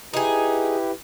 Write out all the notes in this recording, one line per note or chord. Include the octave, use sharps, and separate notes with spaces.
D#4 E4 G4 G#4 B4